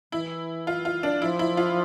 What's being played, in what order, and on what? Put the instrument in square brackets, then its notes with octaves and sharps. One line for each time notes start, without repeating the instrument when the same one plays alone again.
[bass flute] E3 [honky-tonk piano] E4
[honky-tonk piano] F4
F4
D4
[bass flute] F3 [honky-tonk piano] E4
[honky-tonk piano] E4
F4